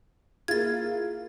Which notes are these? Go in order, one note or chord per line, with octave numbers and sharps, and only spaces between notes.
A#3 E4 F4 G#4 G#6 A6